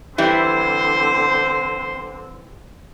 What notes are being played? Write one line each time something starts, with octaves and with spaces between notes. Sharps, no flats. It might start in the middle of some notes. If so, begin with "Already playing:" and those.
D3 E3 G3 C4 E4 C5